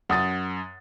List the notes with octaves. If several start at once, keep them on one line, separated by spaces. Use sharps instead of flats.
F#2 F#5 D#6 A6